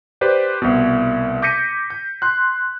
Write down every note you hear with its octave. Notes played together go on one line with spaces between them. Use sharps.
G4 B4 C5 D5
C2 B2
D6 G6 A#6 B6 C#7 D#7
G6
C6 F#6